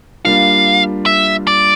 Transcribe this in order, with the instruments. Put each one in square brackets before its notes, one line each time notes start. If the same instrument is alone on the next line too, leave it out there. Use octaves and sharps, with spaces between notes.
[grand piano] G3 A#3 D4 F4 [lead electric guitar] F5
[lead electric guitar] E5
D5